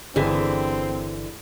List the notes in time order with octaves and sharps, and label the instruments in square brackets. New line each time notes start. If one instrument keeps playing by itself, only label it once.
[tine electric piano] G1 [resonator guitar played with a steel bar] D3 E3 [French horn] C4 [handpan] G4 G#4